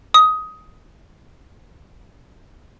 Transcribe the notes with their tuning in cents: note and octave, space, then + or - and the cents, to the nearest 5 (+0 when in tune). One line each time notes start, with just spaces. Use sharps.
D#6 +15